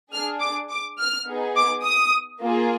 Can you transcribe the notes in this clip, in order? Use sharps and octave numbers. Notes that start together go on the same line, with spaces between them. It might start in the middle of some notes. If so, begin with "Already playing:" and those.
D4 G#4 F6
D6
D6
F6
B3 D#4 G#4
D6
D#6
A#3 F4 G#4